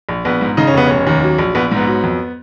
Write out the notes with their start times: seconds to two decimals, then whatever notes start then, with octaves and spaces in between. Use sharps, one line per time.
0.09 A#1
0.25 A#1 B3
0.41 G#2
0.57 C#3 D#4
0.67 C#4
0.74 F1 B3
0.87 F1 C#4
1.07 D#2
1.23 F#3
1.39 A#1
1.55 A#1 B3
1.71 G#2 B3
1.87 F#3
2.03 F2